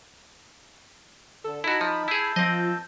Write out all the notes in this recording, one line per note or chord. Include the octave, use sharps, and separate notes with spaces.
D3 A4
D#4 E4 F#4 A5 B5
F3
E4 G#4 A5 E6 G6
F3 C4 D#5